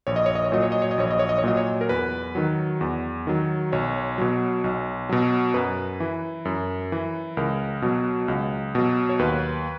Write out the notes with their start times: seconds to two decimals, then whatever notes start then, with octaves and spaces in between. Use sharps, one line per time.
0.07 A#1 C#5
0.16 D#5
0.26 C#5
0.35 D#5
0.44 C#5
0.52 A#2 F#3 D#5
0.63 C#5
0.72 D#5
0.82 C#5
0.91 D#5
0.98 A#1 C#5
1.11 D#5
1.19 C#5
1.29 D#5
1.38 C#5
1.44 A#2 F#3 D#5
1.57 C#5
1.81 A#4
1.89 E2 B4
2.35 D#3 F#3
2.81 E2
3.27 D#3 F#3
3.72 B1 C#5
4.18 B2 F#3
4.64 B1
5.09 B2 F#3
5.54 F#2 B4
6.00 E3
6.45 F#2
6.92 E3
7.37 C#2 A#4
7.82 B2 F#3
8.28 C#2
8.75 B2 F#3
9.09 C#5
9.19 D#2 B4